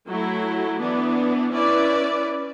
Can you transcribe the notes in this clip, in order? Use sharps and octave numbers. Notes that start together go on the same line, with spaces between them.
F#3 A3 E4
E3 B3 D4
C#4 E4 B4 D5